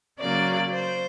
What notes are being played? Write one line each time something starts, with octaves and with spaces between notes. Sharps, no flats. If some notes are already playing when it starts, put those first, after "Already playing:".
C#3 F#3 A#3 D5
C5